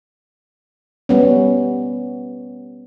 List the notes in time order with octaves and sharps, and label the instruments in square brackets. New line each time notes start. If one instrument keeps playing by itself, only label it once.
[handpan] G3 B3 C#4